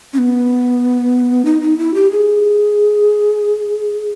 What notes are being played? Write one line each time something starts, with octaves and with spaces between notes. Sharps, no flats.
C#4
B3
D#4
D#4
E4
G4
G#4